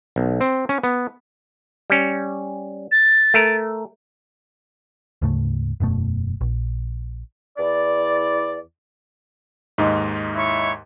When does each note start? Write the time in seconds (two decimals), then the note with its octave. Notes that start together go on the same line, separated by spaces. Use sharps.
0.16 B1
0.41 C4
0.69 C#4
0.83 B3
1.90 G3 C#4
2.92 A6
3.34 A3 A#4
5.22 D2 G#2 C#3 A3
5.80 E1 F#2 B2 A3
6.41 A#1
7.57 E2 E4 D5
9.78 D#2 G#2 D#4
10.35 E4 C#5